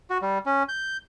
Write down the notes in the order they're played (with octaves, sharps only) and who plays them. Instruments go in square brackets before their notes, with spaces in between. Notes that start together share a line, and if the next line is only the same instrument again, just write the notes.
[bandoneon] F#4
G3
C#4
G6